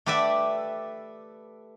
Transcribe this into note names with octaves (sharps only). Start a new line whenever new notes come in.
A3 G4 B4 D5 E5